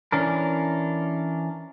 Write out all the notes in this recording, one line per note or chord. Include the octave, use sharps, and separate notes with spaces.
E3 C#4 D4 A#4